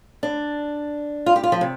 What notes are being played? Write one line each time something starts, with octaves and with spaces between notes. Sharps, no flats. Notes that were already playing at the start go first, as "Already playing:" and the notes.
D4
F4
G4
F4
F3
C3